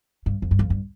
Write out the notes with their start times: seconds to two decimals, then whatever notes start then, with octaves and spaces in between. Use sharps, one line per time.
0.26 G2
0.42 F2
0.51 G2
0.59 F2
0.70 G2